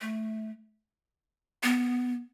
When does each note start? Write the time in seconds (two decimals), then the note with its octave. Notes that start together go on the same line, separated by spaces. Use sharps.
0.01 A3
1.63 B3